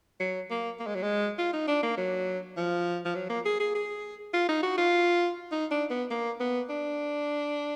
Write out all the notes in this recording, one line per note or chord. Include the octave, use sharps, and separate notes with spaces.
F#3
A#3
A#3
G#3
F#3
G#3
F4
D#4
D4
A#3
F#3
F3
F3
F#3
A#3
G#4
G#4
G#4
F4
D#4
F#4
F4
D#4
D4
B3
A#3
B3
D4